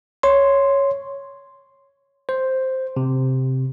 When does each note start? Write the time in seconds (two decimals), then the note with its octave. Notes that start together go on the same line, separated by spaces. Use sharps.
0.23 C#5 C6
2.29 C5
2.97 C3